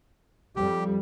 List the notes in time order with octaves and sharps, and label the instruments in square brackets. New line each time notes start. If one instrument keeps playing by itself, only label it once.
[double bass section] F2 G3 [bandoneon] G4